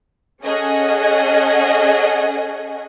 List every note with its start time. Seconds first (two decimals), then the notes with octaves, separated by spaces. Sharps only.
0.43 C#4 G#4 A4 D#5 F#5 G#5